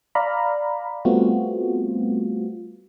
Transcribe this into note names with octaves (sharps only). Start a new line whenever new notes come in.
D5 F5 A#5 B5
G3 A3 B3 C4 F4 F#4